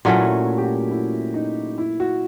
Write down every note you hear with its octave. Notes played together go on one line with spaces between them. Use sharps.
A#2 F#3 A3 C#4 E4
G4
F#4
E4
D#4
E4
F#4